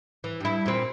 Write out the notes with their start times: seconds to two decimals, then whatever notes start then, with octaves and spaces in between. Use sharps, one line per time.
0.24 E3
0.40 G2 E4
0.66 A#2 C4